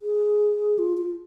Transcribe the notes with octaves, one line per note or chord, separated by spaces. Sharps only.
G#4
F4
F4